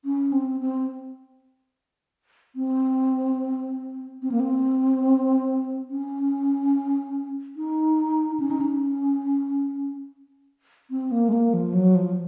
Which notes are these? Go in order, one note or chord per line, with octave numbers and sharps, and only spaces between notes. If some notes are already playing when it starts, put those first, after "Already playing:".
C#4
C4
C4
C4
C4
A#3
C4
C#4
D#4
C#4
D#4
C#4
C4
A#3
G#3
A#3
F3
F#3
F3